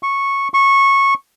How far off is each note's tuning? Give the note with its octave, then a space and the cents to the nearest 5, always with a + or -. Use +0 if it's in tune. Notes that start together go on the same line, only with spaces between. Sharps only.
C#6 -10
C#6 -15